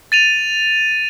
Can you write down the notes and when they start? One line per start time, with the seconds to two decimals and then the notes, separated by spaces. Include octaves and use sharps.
0.12 A6 D#7 F7